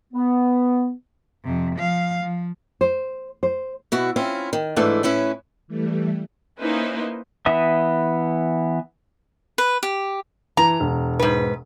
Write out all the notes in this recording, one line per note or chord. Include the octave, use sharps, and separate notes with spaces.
B3
F2 C3
F3 F5
F3
C5
C5
B2 E4 F#4
C4 C#4 E4 F4
D#3
G#2 E3 A3 D4 E4
A2 C#4 E4 B4
E3 G3 A3
A#3 C#4 D#4 E4 B4 C5
E3 B3 E5 D#6
B4
G4
E3 A#5
E1
G#2 B4